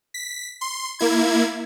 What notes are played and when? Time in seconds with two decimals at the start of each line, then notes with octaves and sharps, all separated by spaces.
0.14 B6
0.61 C6
0.99 A#3 E4 G#6